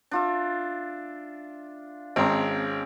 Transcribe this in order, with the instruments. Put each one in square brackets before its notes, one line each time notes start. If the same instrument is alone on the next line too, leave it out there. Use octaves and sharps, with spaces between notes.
[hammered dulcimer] D4 F4 E5
[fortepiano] G#1 G#3 A#5 [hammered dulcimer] C4 C#4